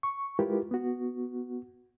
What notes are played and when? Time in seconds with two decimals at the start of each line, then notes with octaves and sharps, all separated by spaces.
0.03 C#6
0.39 G#3 E4 F4 G4 A#4 B4
0.71 B3 F#4